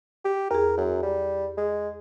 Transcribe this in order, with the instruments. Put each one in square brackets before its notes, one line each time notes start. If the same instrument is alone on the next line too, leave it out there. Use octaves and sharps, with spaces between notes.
[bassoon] G4
[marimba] E2 G#4 [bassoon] A#4
[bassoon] F#2
G3
G#3